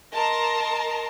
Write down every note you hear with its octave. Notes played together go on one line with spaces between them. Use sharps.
A#4 D#5 A5 A#5 C6